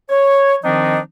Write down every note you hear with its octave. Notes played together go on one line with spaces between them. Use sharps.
C#5
D#3 F3 C4 D4 D#4 D#5